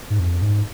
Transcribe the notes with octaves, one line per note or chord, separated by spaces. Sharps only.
G#2
F2
G#2